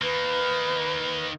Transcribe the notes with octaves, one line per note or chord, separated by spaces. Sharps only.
D#3 A#3 B4